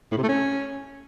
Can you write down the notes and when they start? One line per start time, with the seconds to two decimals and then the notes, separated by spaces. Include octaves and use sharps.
0.12 A2
0.17 C3
0.23 A3
0.29 C#4